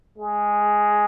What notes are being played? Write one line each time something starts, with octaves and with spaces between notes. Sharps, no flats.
G#3